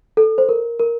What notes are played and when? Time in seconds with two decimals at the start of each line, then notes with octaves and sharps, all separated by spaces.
0.17 A4
0.38 C5
0.49 A#4
0.79 A#4